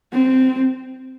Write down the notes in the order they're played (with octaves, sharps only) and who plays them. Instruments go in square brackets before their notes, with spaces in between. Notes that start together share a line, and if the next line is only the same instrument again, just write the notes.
[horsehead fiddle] C4